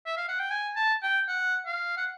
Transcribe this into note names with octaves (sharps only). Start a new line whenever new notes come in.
E5
F5
F#5
G5
G#5
A5
G5
F#5
F5
F#5